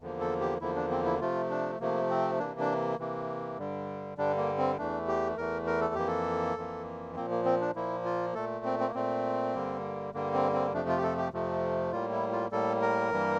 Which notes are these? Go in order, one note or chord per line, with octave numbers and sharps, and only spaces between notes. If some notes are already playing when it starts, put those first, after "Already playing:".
E2 D3 F3 A#3
A4
G4
E2 D3 F3 A#3 E4
D4
C4
E4
C3 F3 A3 F4
D4
C3 F3 A3 A#3
C4
C3 E3 A#3 D4
D4
C3 E3 A#3
G2 D3 G3
G2 D3 G3 D4
A#3
C4
E2 E3 A3 D4
G4
E2 E3 A3 A#4
A#4
A4
F2 E3 A#3 G4
A4
F2 E3 A#3
A#2 F3 A#3 C4
A#3
C4
D4
A#2 F3 A#3 E4
F4
A#2 A3 A4
C4
C4
A#3
A#2 A3 C4
G2 D3 G3 A#3
G2 D3 G3 A#3
C4
C4
F2 C3 F3 A3 D4
F4
G4
A4
G4
F2 C3 F3 A3
A2 G3 A#3 F4
E4
F4
A2 G3 A#3 A4
A#4
G2 E3 G3 A#3